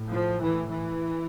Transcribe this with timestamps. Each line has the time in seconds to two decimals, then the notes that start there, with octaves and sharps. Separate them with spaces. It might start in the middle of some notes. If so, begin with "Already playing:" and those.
Already playing: A2
0.11 F3
0.40 E3
0.70 E3